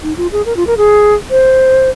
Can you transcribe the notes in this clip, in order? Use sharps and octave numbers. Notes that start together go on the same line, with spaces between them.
D#4
F4
G#4
A#4
F4
A#4
G#4
C5